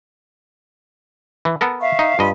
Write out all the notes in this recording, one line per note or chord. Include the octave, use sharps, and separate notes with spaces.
E3
B3 A4 A#4
E5 F5 C#6
D#4
G2 F4 D#5 B5